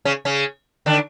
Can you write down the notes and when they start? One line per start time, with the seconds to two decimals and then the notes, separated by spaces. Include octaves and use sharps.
0.05 C#3 C#4
0.25 C#3 C#4
0.86 D3 D4